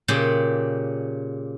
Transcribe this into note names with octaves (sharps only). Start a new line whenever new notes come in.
A#2 C#3 G4